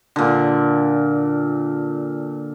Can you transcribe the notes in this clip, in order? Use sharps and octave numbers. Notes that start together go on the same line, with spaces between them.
A#2 D3